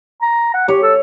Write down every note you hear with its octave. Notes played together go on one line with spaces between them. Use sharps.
A#5
F#5
G4 C#5
A4